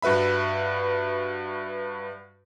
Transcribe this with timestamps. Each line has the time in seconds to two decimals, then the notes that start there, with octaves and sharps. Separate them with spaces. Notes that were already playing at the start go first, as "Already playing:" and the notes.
0.02 G2 F#4 B4 E5 B5